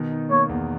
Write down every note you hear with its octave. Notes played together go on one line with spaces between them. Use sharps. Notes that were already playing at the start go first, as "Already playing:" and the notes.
Already playing: B2 D#3
D#4
A#3 C#5
E2